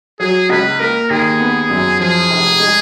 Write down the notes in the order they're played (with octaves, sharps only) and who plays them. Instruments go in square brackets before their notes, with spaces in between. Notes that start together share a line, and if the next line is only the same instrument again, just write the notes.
[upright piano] F#3 [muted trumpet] G#4
[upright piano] C#2 [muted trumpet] B4
[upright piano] A#3 [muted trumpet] A#4
[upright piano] D#2 [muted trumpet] G#4
[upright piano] B3
F#2
[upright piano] F3 [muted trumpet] G#4
[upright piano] F1
G#3